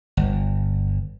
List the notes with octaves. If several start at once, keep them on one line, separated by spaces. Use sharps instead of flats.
G1